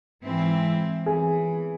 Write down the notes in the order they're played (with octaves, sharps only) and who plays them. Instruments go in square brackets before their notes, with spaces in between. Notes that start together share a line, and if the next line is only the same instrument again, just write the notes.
[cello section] G#2 E3 C4 E4
[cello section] E3 [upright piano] G#4